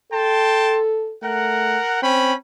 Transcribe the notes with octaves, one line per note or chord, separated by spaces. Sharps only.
A4 G5 A5 C6
A3 A#4 F#5
C4 C#4 G5 B5